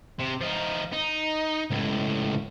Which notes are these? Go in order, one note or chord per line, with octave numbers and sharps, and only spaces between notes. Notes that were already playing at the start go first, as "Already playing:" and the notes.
C3
F3 D#4
D#4
C#2 A2